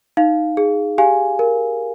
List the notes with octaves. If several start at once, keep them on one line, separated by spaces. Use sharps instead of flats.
D#4 F5
G#4
G4 F5 G#5
A#4